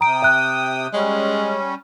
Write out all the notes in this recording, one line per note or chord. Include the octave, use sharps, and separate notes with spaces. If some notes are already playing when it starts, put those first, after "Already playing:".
C3 G5 A#5 D#6 D7
E5 F#6
G3 G#3 C#4